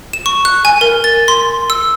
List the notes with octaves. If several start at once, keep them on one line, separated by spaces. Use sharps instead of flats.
E7
C#6
F#6
G#5
A#4
A6
C6
E6